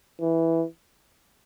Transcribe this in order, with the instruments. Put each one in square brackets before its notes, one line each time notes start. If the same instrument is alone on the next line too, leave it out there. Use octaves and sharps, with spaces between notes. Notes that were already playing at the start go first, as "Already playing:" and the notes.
[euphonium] E3